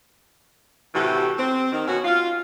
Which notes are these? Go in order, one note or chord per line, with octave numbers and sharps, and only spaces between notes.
A2 C3 E3 F#4 G4
C4
D#3
B2 C#4 F#4
F4